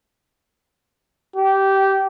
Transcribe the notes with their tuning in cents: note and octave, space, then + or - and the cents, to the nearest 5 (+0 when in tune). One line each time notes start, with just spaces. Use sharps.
G4 -15